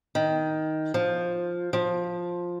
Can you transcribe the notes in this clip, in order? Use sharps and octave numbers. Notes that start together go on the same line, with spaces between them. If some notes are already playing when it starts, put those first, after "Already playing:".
D#3
F3
F3